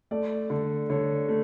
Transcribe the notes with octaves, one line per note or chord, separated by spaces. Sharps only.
A3 D5
D3
D3 C#5
A3